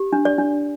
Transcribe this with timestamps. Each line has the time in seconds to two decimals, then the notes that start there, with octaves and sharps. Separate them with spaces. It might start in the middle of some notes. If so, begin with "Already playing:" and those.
Already playing: G4
0.13 D4
0.25 D5
0.38 D4